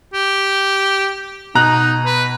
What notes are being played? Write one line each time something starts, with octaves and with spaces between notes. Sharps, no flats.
G4
B2 D#4 A#5 F#6
B4